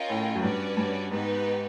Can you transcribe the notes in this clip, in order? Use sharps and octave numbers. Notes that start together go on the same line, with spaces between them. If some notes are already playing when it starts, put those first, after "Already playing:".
Already playing: C#4 F4 A#4 D#5 G5
A2
F#2
G2 C#4 F#4 B4 D5
G2
G#2 B3 D#4 G4 B4